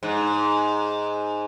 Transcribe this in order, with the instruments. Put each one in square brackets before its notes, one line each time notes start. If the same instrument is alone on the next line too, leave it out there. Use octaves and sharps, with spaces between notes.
[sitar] G#2